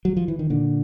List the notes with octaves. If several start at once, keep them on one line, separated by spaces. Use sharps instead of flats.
F#3
F3
E3
D#3
A#2 D3